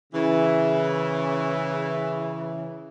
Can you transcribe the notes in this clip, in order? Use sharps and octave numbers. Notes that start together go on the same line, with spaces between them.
C#3 E3